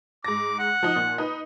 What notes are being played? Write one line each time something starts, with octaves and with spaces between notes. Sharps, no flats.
G#2 D6 A#6
F#5
F3 D#4
A#2
D#4 B4